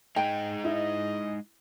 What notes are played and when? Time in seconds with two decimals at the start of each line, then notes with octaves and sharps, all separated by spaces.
0.16 G#3 D#4 G5
0.64 E4 D#5